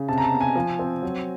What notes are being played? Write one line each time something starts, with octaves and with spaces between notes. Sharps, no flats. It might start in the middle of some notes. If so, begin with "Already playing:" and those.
Already playing: C#3
C3 A5
A#5
A5
B3
G#5
F3
C4
F#3